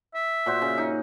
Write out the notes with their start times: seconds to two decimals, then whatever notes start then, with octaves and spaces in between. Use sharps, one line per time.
0.15 E5
0.46 A#2 F#4 C5
0.62 C#3
0.78 D#4